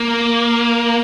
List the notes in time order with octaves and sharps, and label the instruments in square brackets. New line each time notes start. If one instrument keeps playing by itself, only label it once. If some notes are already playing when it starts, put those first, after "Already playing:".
Already playing: [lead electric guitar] A#3